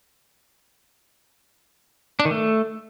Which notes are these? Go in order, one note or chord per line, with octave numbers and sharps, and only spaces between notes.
D4
D#3
A3